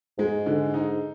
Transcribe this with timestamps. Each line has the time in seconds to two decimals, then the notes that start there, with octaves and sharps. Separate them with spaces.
0.18 G#2 G#3
0.46 D3
0.74 D#4